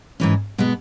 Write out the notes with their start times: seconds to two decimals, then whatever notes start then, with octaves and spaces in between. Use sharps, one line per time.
0.20 G#2 E3 C#4
0.58 B2 G#3 B3